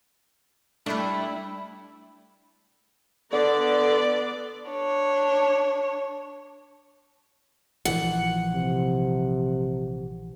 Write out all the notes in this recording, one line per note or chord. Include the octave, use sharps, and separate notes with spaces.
G3 A3 D4 E4
D3 B3 A4 D5
D4 C#5
A#1 E3 F3 F#5
C3